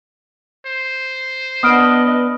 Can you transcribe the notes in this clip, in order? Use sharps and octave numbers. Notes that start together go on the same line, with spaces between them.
C5
B3 D4 B4 D#5 D#6 F6 D7